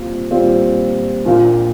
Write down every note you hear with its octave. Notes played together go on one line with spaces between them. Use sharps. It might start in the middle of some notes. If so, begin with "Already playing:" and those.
Already playing: A#2 G3 C4 F4
A#2 G3 C4 F4
A#1 A#2 A#3 F4